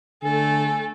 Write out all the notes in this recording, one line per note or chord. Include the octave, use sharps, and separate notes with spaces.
D3 A3 A4 G#5